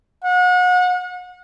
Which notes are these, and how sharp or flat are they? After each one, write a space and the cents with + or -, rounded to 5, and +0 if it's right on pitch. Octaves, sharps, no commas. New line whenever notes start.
F#5 -35